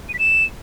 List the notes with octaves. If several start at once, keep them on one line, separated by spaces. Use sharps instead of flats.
D#7
B6
E7